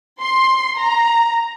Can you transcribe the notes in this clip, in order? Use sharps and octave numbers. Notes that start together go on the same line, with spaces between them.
C6
A#5